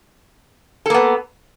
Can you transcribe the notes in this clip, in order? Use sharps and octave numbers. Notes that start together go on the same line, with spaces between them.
A#3 B3 A4